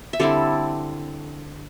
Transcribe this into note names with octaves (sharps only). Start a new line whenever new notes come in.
E5
D3 G3 C4 E4 A4 D5